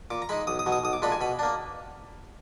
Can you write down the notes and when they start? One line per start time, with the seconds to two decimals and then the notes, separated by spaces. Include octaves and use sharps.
0.10 A#2 D6
0.22 A#5
0.29 G#3 D#4 B5
0.47 B1 D#6
0.59 D#6
0.66 B2 F#3
0.72 D#6
0.84 B1 D#6
0.93 D6
1.02 A#2 G#3 D4 B5
1.12 G#5
1.21 B2 B5
1.39 A#3 D4